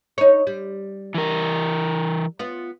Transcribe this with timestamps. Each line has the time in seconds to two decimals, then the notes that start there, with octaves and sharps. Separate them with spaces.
0.18 D#4 C#5
0.47 G3
1.15 E3 A#4
2.39 B3 F4